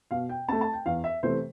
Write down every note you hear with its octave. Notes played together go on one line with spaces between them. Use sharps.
B2 F5
G5
A3 C4 A5
A5
G5
E2 F5
E5
C3 E3 A3 C5